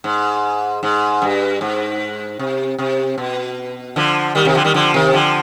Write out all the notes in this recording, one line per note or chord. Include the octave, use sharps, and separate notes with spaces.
G#2
G#2
G2
G#2
C3
C3
B2
D3 F3
D#3 G3
C3 D#3
D3 F3
D#3 G3
D3 F3
C3 D#3
D3 F3